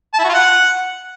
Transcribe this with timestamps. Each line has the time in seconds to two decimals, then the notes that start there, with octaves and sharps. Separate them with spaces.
0.14 A5
0.19 E4
0.24 F#4
0.29 F4
0.34 F#5